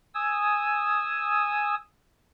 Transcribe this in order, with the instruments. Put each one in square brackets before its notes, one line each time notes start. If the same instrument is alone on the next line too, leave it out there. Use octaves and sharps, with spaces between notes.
[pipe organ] G#5 D#6 E6